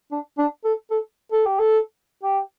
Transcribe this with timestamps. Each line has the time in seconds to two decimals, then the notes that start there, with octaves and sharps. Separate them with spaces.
0.12 D4
0.38 D4
0.65 A4
0.91 A4
1.32 A4
1.46 G4
1.59 A4
2.23 G4